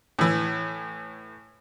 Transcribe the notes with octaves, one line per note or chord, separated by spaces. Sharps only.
A2 E3